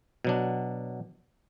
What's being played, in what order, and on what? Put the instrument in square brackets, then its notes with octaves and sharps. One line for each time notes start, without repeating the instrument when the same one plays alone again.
[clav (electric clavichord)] B2 F#3 D4